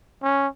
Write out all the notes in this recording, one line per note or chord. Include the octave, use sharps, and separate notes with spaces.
C#4